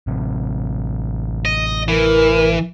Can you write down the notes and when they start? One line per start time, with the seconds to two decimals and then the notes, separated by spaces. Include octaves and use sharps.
0.07 A1 C3
1.45 D#5
1.88 E3 A#4